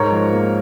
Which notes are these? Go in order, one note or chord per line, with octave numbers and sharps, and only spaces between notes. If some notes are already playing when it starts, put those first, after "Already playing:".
Already playing: G#2 A#4 C#5
F3
A#3